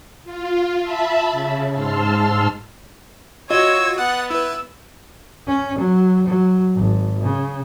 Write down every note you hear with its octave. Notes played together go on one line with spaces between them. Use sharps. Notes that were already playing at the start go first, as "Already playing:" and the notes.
F4
E5 A5 B5
C#3
G#2 A5 C6 E6 F6
F4 F#4 C#5 D#5 E6 G#6
B3 F#5 D#6 F#6 A6
E4 B4 E6
C#4
F#3
F#3
G#1
C#3